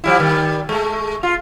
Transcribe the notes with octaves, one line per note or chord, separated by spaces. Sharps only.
F3 G3 E4
D#3 G3
G#3 A3
F4